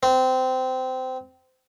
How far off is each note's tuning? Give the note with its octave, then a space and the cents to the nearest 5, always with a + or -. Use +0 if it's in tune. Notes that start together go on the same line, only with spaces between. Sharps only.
C4 -20